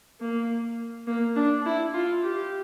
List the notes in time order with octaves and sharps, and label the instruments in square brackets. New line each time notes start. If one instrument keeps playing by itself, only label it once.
[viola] A#3
A#3
D4
E4
F4
G4